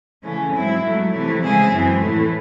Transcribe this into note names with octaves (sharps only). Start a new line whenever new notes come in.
C#3 E3 A3 C#4
G#2 F#3 C4 E4
G#2 F#3 A3
C3 E3 A3
C#3 G#3 C4 E4 G#4
F#2 E3 C4
A2 E3 A3